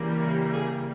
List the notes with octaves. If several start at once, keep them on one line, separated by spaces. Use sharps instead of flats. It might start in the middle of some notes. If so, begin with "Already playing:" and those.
Already playing: C#3 E3 G3 A#3
G#4